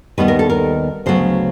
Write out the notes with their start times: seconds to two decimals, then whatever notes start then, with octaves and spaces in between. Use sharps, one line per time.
0.18 D#2 D#3 G3 B3 B4
0.28 A#4
0.39 A4
0.50 A#4
1.06 D2 C#3 F#3 B3 C5